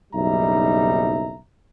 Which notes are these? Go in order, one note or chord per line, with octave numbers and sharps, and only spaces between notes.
F#1 B1 G3 D#4 E5 A#5